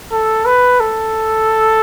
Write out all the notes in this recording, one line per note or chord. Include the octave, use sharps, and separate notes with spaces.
A4
B4
A4